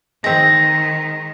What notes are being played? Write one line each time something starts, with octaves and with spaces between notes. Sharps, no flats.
D#3 G#3 C4 A#6